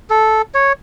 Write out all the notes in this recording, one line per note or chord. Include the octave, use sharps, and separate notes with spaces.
A4
C#5